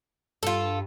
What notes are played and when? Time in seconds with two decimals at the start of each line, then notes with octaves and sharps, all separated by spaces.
0.43 G2 F4 A4